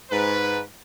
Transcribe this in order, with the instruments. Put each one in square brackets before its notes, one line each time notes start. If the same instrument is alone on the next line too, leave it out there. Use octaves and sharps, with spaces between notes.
[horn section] G#2 B4